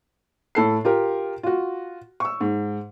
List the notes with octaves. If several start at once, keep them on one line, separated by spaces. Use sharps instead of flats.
A2 A4 C7
F4 G4 A#4
F4 F#4
C#6 E6
G#2